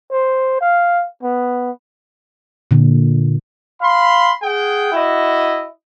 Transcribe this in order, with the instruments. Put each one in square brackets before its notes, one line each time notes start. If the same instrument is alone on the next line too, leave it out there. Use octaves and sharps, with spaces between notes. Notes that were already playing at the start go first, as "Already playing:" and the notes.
[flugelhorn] C5
F5
B3
[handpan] A#2 D3
[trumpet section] F5 B5 C6
G#4 F#5 G5
E4 F#4 D#5